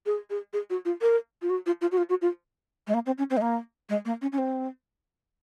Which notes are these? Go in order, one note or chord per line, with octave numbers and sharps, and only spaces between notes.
G#4
G#4
G#4
F#4
F4
A#4
F4
F#4
F4
F4
F#4
F4
F#4
F4
G#3
A#3
C4
C#4
C4
G#3
A#3
G#3
A#3
C#4
C#4
C4